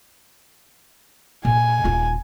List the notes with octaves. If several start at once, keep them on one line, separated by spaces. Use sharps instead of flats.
A#2 G#5
D#1 F4